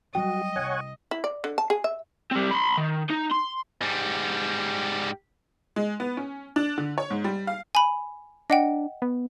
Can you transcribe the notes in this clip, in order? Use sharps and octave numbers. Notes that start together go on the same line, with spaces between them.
F#3 G3 F#4 D#5 G5
C2 C#5 F#5 G#5
E4
D5
D3
A5
G#4
E5
G3 C4
B5 C6
D#3
D#4
C6
G#2 G3
G#3
B3
C#4
D4
D3
C#5
G#2
G3
F5
G#5 B5
D4 D#5 F#5 G5
B3